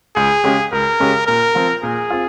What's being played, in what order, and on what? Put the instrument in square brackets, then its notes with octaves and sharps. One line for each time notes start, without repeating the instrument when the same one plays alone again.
[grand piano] C#2 [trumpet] G#4
[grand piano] C#3 G#3 C#4 G4
[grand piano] C#2 [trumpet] A#4
[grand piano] C#3 G#3 C#4 G4
[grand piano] A#2 [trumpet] A#4
[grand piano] F3 C4 F4
[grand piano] A#2 [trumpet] G#4
[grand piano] C4 F4